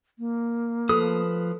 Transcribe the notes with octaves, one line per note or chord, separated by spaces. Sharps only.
A#3
F3 A4 B4 D#6